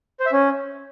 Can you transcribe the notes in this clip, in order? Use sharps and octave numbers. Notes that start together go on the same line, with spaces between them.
C5
E5
C#4